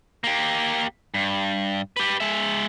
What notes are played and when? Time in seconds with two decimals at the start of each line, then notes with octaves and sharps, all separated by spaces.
0.24 A#3 G4
1.14 G2
1.97 G4 B4
2.20 G#3 E5